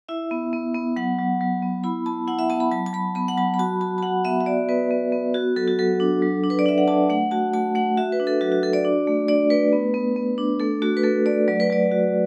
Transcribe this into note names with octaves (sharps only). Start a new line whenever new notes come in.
E4 E5
B3
B3
B3
F#3 F#5
F#3
F#3
B3
E4 B5
B3 A5
E4 F#5
E5
B3 A5
B5
F#3 A5
A5
F#3 B5
B3 B5
F#5
F#3 A5
B5
F#4 A5
F#4 A5
A5
F#4 F#5
B3 E5
E5
F#4 D5
B3 B4
B3
B3
F#4
F#3 A4
F#4
F#3 A4
D4
F#3
D4
B4
D5
D4 E5
F#5
D4 A5
A3 F#5
F#4 A5
A3 A5
A3 F#5
F#4 E5
B4
D4
A4
F#3 F#4
F#4
F#4 A4
D5
D4
A3
D4 D5
A3 B4
B3
B3
B3
D4
A3 A4
A3 F#4
B4
A3 A4
A3 D5
F#3 D5
B4
F#3 D5
F#4